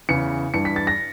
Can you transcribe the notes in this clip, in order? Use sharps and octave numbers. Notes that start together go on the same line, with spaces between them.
E2 C#3 E3 C#7
G2 E3 C#7
B6
A6
A#6